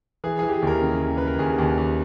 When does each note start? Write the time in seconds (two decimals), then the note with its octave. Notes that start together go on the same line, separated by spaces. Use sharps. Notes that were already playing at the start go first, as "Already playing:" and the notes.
0.24 E3 G#4
0.39 E3 G#4
0.48 G4
0.53 G#4
0.62 D#2 A#4
0.81 C#3
1.01 D#2
1.17 C#3 B4
1.27 A#4
1.39 D#2 G#4
1.58 D#2
1.78 D#2